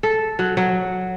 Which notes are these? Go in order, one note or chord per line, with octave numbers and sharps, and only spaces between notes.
A4
F#3
F#3